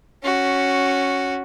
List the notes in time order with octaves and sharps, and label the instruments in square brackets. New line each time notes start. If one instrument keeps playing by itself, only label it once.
[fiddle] C#4 F#4